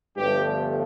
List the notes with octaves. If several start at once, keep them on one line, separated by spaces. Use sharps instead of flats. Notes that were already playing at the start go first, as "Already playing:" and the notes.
G1 G2 F3 A3 G4